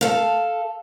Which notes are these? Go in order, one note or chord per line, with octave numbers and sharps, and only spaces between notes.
A4 F5